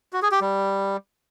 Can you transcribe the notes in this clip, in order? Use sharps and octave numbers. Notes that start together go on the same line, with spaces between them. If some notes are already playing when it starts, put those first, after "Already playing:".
F#4
G#4
G4
G3